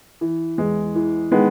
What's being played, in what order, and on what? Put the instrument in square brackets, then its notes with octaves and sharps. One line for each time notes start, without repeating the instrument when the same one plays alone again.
[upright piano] E3
E2 G#3
E3
D#3 G#3 B3